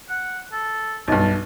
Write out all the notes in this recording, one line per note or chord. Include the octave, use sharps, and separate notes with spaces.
F#5
A4
B1 G2 A5